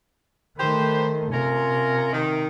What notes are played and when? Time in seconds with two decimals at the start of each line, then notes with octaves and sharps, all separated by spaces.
0.59 D#3 A3 G4 B4 C5
1.32 C3 C#4 F4 A#4
2.12 D#3